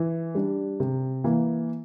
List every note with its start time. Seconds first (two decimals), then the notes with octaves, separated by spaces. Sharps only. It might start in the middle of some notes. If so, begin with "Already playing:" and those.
Already playing: E3
0.35 G3 D4
0.80 C3
1.24 E3 A#3